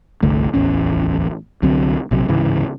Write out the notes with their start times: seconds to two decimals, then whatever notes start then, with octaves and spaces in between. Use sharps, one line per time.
0.22 G1 C2 D3 A3
0.53 D1 A1 E2 C#4
1.62 C2 D3 F#3 C4
2.11 A#1 C3 F#3
2.28 D1 G#2 C#3 E3